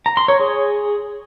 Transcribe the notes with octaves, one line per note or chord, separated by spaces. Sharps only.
A#5
C6
C#5
G#4